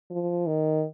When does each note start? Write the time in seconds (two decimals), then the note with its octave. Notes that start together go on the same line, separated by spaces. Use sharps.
0.10 F3
0.46 D#3